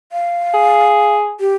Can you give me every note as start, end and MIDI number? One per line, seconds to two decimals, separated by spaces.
0.12 1.14 77
0.54 1.35 68
1.40 1.55 67